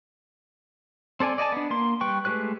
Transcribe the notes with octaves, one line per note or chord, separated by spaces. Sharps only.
C4 A4 D5 G#5
D5 D#5 G#5 A5
B3 D4
A#3 C6
G3 B4 G5 C#6
G#3 A3 G4 B4 F#6